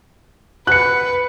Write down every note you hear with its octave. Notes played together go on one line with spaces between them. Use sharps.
B4 F#6 C#7